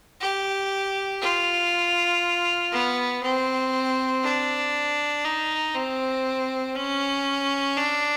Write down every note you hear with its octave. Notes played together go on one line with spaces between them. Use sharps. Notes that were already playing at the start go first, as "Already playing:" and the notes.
G4
F4
B3
C4
D4
D#4
C4
C#4
D4